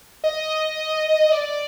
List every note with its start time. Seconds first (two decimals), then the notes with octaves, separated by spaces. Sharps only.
0.24 D#5
1.32 D5